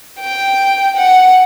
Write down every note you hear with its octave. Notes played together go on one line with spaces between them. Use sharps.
G5
F#5